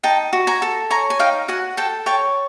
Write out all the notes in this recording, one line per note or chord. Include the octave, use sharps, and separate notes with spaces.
D#4 G5 A5
F#4
G#5 A#5
A4
C#5 G#5 A#5
G#5
D#4 F5 G5
F#4 F#5 G#5
A4 G5 A5
C#5 G5 A5